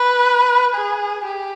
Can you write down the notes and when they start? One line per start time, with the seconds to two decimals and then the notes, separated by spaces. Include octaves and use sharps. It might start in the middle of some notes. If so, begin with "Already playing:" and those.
Already playing: B4
0.74 G#4
1.25 G4